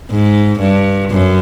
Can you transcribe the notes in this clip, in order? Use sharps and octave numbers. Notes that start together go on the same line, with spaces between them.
G#2
G2
F#2